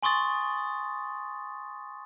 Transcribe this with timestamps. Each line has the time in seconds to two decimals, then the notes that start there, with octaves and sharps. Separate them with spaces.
0.03 G#5 C6 C#6 D#6 A6